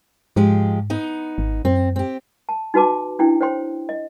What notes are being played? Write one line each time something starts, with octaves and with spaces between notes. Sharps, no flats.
G#2 F3 G#3 G4
B3 D#4
G#1
F#2 C4
C4 G4
A5
D#4 F#4 B4 A5 D6
C#4 D4 E4 G5
C5 C#5 G5 C6
D#5